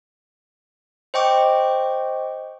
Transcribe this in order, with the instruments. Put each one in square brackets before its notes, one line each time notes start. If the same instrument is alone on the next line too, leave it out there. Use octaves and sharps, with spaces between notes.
[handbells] C5 D#5 G5 C#6 D6